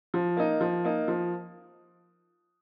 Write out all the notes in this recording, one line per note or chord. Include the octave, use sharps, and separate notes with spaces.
F3
A#3 D#4
F3
A#3 D#4
F3